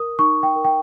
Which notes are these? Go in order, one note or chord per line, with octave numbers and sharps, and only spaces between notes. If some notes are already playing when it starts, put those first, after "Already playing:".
Already playing: A#4 D#6
D#4 C#6
G5
A#4
G5